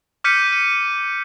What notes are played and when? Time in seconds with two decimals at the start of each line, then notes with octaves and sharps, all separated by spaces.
0.24 D6 F6 G6 B6 C#7 D#7
0.53 D#7